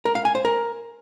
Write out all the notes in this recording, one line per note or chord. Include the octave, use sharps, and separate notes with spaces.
A#4
F5
G#5
C5
A#4